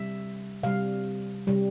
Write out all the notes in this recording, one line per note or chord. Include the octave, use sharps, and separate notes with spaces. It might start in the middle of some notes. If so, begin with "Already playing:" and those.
Already playing: C3 G3 E5
C3 G3 F5
C3 G3